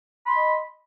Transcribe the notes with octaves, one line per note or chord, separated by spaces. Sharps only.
D#5 B5 C6